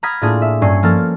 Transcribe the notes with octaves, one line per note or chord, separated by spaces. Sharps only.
A#5 B5 D#6 F6 G#6 B6
A2 A#3 D4 F4 G#4
E5
G2 C#4 G#5 C7 C#7
F3 A#3 A4 F6 A6